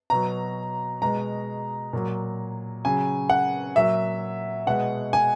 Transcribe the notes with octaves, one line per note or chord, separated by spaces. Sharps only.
B2 F#3 A#5
B2 G#3 A#5
A#2 F#3
C#3 F#3 G#5
F#5
A#2 F#3 E5
B2 G#3 F#5
G#5